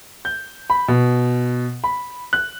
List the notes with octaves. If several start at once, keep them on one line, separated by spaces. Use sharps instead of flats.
G6
B5
B2
B5
F#6